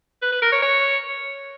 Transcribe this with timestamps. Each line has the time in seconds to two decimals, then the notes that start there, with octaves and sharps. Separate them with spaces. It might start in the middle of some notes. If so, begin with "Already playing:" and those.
0.22 B4
0.32 B4
0.42 A#4
0.52 C#5
0.62 C#5